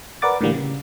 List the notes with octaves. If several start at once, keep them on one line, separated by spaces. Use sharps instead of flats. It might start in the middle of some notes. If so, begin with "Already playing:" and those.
A#4 B4 D5 F#5 D6 A6
A2 D3 E3 G3 A#3
C#3